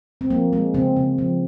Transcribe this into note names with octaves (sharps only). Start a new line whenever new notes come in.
C4
F3 A#3
G#3
C#3 C4
C#3
F3